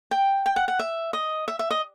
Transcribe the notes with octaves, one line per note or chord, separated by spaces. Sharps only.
G5
G5
F#5
F#5
E5
D#5
E5
E5
D#5